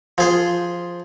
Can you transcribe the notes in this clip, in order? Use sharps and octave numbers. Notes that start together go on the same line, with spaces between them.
F3 G#4 C5